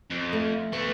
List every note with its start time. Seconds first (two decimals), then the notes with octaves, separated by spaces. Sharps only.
0.10 F2
0.33 A3
0.73 A3 B3 F#4